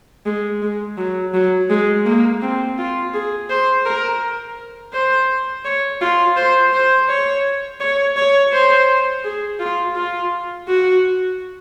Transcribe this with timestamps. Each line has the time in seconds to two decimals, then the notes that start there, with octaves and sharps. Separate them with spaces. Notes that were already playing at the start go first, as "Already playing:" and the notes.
0.26 G#3
0.62 G#3
0.98 F#3
1.34 F#3
1.70 G#3
2.06 A#3
2.42 C4
2.78 F4
3.14 G#4
3.50 C5
3.86 A#4
4.93 C5
5.65 C#5
6.01 F4
6.36 C5
6.73 C5
7.09 C#5
7.80 C#5
8.17 C#5
8.53 C5
9.24 G#4
9.60 F4
9.96 F4
10.68 F#4